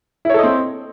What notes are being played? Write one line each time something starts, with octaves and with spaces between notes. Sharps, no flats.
C4 E4 A4 C#5 D#5